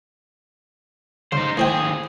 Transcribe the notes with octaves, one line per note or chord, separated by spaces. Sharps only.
C#3 D#4 C5
D#2 A2 G#4 C5 G5